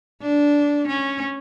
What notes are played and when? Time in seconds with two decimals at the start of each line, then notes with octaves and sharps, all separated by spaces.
0.22 D4
0.88 C#4